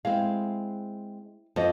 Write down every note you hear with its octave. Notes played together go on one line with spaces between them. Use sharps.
G#3 C4 E4 F5
F2 A4 C5 D#5